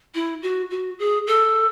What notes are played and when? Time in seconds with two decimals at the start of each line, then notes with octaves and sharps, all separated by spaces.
0.14 E4
0.42 F#4
0.70 F#4
0.99 G#4
1.27 A4